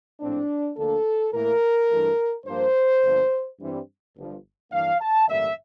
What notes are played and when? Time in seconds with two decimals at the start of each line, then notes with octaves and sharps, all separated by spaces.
0.20 A#1 A2 F3 C4 D4
0.77 D2 D3 F3 A#3 D4 A4
1.33 A2 E3 A#3 A#4
1.90 G2 E3 A3
2.46 G2 F3 A#3 C5
3.02 G1 G2 F3 A#3 D4
3.60 G2 E3 G3 C4
4.16 G1 G2 F3
4.72 G2 E3 A#3 D4 F5
5.00 A5
5.28 A1 G2 D3 G3 A#3 E5